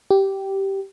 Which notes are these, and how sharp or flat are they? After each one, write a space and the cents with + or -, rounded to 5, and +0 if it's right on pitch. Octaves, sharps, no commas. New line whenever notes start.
G4 -10